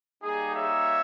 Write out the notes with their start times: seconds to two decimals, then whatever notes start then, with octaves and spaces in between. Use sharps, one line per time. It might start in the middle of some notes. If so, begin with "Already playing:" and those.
0.22 G3 A#3 D#4 G#4
0.54 C#5 E5